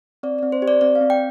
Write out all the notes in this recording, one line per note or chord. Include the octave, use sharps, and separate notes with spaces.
C4 D5
C4 D5
C5
G4
D5
C4 D5
F5
C4
G5